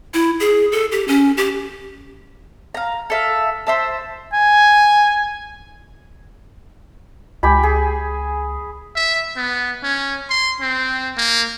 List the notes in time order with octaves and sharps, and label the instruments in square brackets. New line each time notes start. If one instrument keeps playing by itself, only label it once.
[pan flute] E4
G#4
A4
G4
C#4
G4
[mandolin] F5 A#5
A4 E5 F5
C5 E5 A5
[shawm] G#5
[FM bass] C#2 [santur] G4 G#5 B5
[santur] G#4
[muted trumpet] E5
B3
C#4
C6
C4
A#3